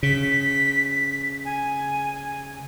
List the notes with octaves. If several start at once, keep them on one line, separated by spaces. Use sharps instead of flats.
C#3 B6
G#5